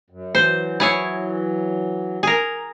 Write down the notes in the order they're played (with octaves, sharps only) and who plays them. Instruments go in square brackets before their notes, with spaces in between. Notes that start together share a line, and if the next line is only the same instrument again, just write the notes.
[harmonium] F#2
[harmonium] E3 F#3 [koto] C5
[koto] E4 G#4 C#5
G#4 A#4